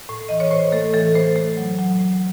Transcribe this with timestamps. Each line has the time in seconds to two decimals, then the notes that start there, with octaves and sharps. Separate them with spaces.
0.09 A2
0.29 E3 D#5
0.40 C#5
0.51 A2 C5
0.72 A3 A4
0.94 E3 A4
1.15 A3 C5
1.36 A3
1.57 F#3
1.79 F#3
2.00 A2